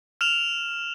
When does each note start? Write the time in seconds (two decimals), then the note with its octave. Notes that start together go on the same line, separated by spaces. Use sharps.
0.21 F6 E7 F7